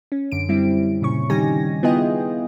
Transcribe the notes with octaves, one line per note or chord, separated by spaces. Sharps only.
C#4
F#2 D3 D7
G3 C4 E4
A#2 C#3 C#4 C#6
D#3 G3 D#4 G4 G#5 A#6
B3 E4 F4 G#4 D#5 G5